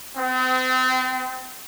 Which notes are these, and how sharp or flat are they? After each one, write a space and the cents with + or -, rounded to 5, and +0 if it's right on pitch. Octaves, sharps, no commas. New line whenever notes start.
C4 -35